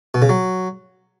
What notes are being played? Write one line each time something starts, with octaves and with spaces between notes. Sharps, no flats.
B2
C#3
F#3